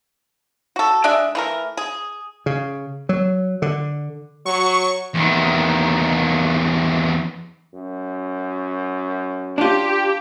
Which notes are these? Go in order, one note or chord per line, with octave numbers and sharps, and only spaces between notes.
F#4 A4
G#3 D4 D5 E5
E3 A3 A#4
G#4
C#3
F#3
D3
F#3 C#6
E2 D#3
F#2
D4 F4 G4